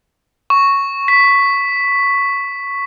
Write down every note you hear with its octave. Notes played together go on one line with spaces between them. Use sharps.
C#6
B6